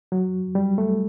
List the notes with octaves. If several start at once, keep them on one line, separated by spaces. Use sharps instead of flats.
F#3
G3
A3